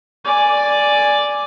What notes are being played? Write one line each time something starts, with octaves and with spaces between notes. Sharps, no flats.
D5 G#5